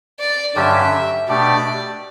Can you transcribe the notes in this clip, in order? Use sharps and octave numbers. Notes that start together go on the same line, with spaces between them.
D5
G2 D3 F#3 C#4 G4 E5
B2 A3 D4 G4 D5